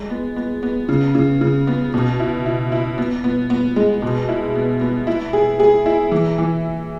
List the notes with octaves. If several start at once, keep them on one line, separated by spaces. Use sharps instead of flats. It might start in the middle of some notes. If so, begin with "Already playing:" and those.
Already playing: G#3
B3
B3
B3
C#3
C#3
C#3
B3
B2
E4
E4
E4
B3
B3
B3
G#3
B2
E4
B3
B3
E4
G#4
G#4
E4
E3
E3